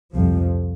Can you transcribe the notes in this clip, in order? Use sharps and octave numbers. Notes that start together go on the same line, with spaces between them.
C2 F2 C3 F3